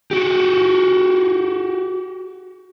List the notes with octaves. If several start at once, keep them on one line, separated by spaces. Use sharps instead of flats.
F#4 G4